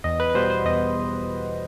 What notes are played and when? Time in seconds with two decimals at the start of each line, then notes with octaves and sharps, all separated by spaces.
0.04 E2 D#5
0.20 B4
0.30 B4
0.35 B2 G3 B3 C5
0.50 C5
0.65 E2 D#5